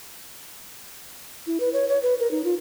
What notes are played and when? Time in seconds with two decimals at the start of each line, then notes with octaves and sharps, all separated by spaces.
1.47 E4
1.60 B4
1.73 C#5
1.88 C#5
2.03 B4
2.20 A#4
2.31 D#4
2.45 F4